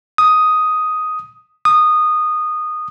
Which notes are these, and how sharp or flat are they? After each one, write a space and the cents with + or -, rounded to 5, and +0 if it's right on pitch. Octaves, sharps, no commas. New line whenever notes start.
D#6 +5
D#6 -15